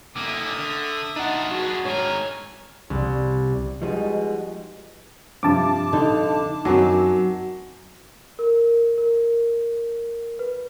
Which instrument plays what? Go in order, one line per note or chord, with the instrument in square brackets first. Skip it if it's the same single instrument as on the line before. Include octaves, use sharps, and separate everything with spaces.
[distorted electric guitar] D3 A#3 [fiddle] E5 D#6 [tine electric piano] D6
[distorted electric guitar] D3
[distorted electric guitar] D4 F4 [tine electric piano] D#4 F#5
[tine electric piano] F#4 [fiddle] G#4 B4
[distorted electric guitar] G#2 A#4 [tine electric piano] C#5 [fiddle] G#5
[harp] C2
[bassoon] B2 [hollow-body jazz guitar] F3 G3 D#4 [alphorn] G#3
[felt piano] G2 C3 F3 [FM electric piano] A5 D6
[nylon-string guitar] D3 D#4
[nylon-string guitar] F#2 C4 [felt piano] D#3 [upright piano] F#3
[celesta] A#4
A#4
B4